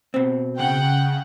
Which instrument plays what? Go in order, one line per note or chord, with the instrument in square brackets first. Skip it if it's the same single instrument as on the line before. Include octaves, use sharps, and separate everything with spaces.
[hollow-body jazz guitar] B2 C4
[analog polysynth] C#3 [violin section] F#5 G5